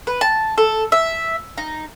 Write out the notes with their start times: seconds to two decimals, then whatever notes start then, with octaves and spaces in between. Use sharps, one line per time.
0.07 B4
0.21 A5
0.58 A4
0.92 E5
1.58 D#4